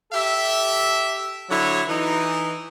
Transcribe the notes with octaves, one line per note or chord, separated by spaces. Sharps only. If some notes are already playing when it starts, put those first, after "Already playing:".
G4 A4 E5
D3 F#3 E4 C#5
E3 D#4